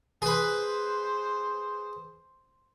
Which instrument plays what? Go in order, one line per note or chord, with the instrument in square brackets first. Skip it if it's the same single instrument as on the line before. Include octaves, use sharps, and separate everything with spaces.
[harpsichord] G#4 B4 [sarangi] C5